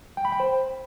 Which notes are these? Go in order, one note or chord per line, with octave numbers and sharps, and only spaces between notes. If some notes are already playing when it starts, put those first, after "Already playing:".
G5
B5
G5
C5